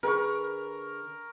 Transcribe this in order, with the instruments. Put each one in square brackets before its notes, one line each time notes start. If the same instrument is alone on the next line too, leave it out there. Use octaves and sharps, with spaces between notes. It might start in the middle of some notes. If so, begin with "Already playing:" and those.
[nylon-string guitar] D3 G#4 B4 [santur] A#4 B5 C#6